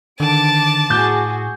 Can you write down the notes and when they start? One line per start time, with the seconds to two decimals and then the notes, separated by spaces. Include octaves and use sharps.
0.20 D3 D#3 A5 D6 D7
0.90 A2 F#4 G#4 D6 G6